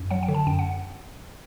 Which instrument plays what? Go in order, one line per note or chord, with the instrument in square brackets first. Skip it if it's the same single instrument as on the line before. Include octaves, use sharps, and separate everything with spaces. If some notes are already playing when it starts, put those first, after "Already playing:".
Already playing: [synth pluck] F#2
F#3 F#5
G5
D3
A5
F#2 G5
F#5